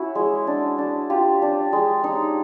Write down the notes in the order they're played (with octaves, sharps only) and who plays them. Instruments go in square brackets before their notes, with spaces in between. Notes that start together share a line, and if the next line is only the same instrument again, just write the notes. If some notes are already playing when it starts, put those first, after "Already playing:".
Already playing: [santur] C#4 E4 F#4
G#3
D4
D4
F4 G4
D4
G#3
D#4